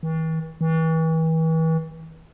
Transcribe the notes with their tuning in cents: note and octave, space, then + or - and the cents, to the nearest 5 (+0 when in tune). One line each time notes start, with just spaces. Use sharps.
E3 -45
E3 -35